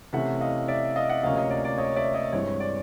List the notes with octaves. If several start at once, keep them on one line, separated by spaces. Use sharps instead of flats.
C3 E3 A3 C#4 E4 E5 F#5
D#5 F5
D5 E5
D#5 F5
E5 F#5
D2 C3 F3 A#3 C#4 D#5 F5
C#5 D#5
D5
D5
C#5 D#5
D5 E5
C#5 D#5
G2 E3 G#3 C4 C#5
D5